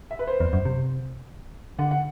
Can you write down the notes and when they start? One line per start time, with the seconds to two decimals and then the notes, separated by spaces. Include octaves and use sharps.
0.11 E5
0.19 B4
0.27 C5
0.40 E2
0.53 F#2
0.65 C3
1.79 D3 F#5
1.91 F#5